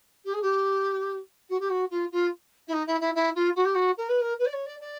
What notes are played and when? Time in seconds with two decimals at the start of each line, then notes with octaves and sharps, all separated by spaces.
0.24 G4
0.33 G#4
0.41 G4
1.49 F#4
1.59 G4
1.69 F#4
1.90 F4
2.11 F4
2.67 E4
2.72 D#4
2.86 E4
3.00 E4
3.14 E4
3.35 F4
3.55 F#4
3.64 G4
3.74 F#4
3.97 A#4
4.08 B4
4.20 A#4
4.38 B4
4.45 D5
4.52 C#5
4.65 D5
4.80 D5